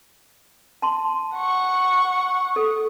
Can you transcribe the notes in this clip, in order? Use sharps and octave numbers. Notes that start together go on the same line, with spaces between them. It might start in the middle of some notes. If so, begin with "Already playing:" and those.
A5 C6
F#5 C#6
A4